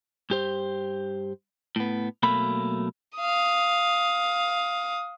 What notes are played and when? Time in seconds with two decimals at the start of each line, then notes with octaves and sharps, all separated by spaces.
0.30 G2 G4 C5
1.76 A2 B3
2.23 B1 B2 F#3 A3 A#3 B5
3.18 F5 D#6